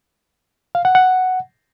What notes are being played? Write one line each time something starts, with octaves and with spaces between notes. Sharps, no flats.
F5
F#5
F#5